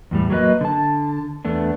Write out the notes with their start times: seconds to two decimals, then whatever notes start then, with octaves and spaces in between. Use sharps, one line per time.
0.11 E2 A2 G3
0.30 F#3 A#3 C4 B4 D#5
0.61 D3 A5
1.45 E2 A3 B3 D4